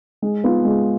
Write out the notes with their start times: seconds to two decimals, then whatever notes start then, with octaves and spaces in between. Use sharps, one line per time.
0.22 G#3
0.44 B3 F4
0.65 G#3